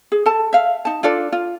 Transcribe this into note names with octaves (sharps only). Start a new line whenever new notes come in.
G#4
A4 A5
E5 F5
D#4 A5
D4 F4 A4 D5
F4